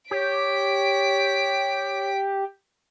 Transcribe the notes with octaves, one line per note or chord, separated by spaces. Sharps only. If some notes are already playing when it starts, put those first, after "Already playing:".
G4 C#5 B6 D7